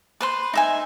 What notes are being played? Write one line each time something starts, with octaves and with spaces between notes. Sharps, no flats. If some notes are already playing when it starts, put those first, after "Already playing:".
B4 C5 C6
D#4 E5 G#5